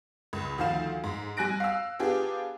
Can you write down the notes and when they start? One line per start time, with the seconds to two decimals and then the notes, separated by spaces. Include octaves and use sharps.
0.33 C#2
0.58 D2 D#3 F3 F5 E7
1.04 G#2
1.37 G3 G#5 F#6 A#6 D7
1.60 F5 E6
1.99 B3 D4 F4 G4 G#4